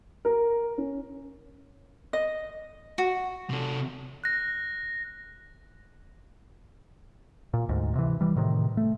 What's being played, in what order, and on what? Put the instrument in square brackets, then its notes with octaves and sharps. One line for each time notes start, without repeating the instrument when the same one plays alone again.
[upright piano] A#4
C#4
[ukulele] D#5
[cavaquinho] F#4
[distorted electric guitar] C3 A4
[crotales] F#6 A#6
[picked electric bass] A#2
D2 G#2
C3 E3
E3 G3
A2 C3 D#3
A3